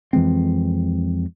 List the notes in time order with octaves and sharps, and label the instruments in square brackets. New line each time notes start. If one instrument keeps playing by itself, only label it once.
[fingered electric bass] F2 E3 G#3 C4